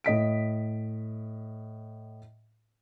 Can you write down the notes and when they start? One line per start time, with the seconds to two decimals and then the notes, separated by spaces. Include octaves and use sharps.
0.04 A2 D#5 B6 D7